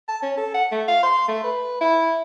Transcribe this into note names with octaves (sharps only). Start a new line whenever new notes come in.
A5
C#4
A4
F#5
A3
F5
C6
A3
B4
E4